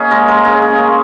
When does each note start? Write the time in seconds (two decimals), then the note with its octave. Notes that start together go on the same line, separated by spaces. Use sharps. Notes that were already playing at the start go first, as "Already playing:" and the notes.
Already playing: A#3 C#4 D#4 G#4
0.11 G#3 A#4
0.28 G#3 A#4
0.45 C#3 G#4
0.62 C#3
0.78 A#3